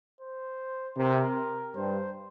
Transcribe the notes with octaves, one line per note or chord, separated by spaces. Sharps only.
C5
C3 A#4
G2 C5